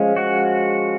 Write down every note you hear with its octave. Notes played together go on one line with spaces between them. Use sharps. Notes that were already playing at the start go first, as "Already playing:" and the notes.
Already playing: F3 G#3 C#4
F#4